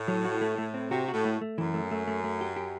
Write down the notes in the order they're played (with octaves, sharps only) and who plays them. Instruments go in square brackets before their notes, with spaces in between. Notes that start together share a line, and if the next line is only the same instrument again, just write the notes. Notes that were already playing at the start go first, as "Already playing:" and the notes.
Already playing: [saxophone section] A2
[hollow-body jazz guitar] F#3
F#4
A3
A3
C4
[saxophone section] C3 [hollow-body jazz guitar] F#4
[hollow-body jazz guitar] F#4
[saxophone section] A2
[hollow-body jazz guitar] A3
A3
[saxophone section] F#2 [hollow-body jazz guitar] E3
[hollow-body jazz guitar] A3
A3
A3
A3
G4
G4